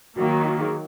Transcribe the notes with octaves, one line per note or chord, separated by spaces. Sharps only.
D#3 F#3 A#3 F#4
F#4
F#4
G#4